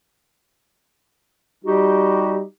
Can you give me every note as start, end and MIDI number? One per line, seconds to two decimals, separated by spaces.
1.65 2.44 55
1.65 2.44 63
1.65 2.44 66
1.65 2.44 67